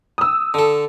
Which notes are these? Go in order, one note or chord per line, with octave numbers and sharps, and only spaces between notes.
D#6 E6
D3 A4